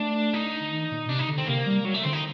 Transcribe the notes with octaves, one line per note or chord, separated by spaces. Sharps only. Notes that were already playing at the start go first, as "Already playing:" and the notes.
Already playing: A3 D4
D#4
D3
D#3
A#2
A#2
C3 D4
D#4
D3
C4
C3 A#3
G3
F#3
A3
D3 C4
D#4